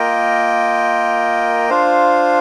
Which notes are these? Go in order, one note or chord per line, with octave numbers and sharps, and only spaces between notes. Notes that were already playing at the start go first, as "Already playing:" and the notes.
Already playing: A#3 F4 A#4 D#5 G5
D4 F4 C5 F5